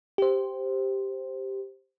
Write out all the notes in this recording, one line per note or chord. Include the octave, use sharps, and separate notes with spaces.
G4 C5